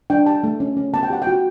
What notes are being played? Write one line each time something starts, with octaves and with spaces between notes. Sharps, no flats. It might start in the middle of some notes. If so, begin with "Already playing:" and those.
D4 G5
G4 A5
A3
C#4
C#4
B3 A5
G5
G4 F#5
G5
F#4